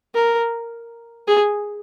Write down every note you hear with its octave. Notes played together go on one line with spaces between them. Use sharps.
A#4
G#4